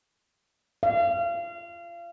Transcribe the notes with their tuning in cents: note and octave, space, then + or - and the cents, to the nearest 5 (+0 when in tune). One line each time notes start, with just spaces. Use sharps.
F5 -30